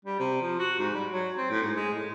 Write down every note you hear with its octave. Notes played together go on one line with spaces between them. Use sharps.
G3
C3
F3
F#4
G#2
G3
F#3
C4
A2
G#2
G#3
A2